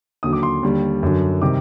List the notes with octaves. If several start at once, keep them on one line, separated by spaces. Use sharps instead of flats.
D#2 D3 F#3 D#6
D6
C6
D#2 D3 G3
F#2 D3 F#3
C3 D#3 G3 D6